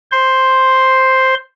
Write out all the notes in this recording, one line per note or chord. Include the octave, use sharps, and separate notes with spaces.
C5 C6